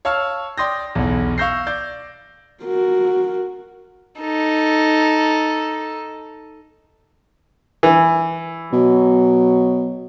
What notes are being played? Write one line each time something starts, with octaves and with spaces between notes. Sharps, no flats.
C#5 F5 A5 C#6 E6 F6
D5 G5 C6 D#6 G6 A#6
B1 E2
F5 C#6 E6 G6 A#6 C7
D5 G6
F#4 A#4
D#4 A4
E3
B2 F#3